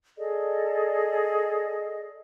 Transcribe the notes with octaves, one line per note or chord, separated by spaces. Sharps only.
G#4 A4 D5 D#5